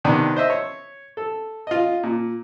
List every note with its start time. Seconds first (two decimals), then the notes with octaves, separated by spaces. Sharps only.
0.04 C3 D#3 B3 D4
0.36 C5 D#5 E5
0.50 C#5
1.17 A4
1.67 F4 D#5
2.03 A#2